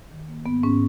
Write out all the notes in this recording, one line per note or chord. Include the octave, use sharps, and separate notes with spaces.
D#3
A#3
G#2 B3
G#2 C#4